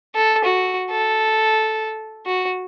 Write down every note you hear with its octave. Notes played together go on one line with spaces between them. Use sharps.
A4
F#4
A4
F#4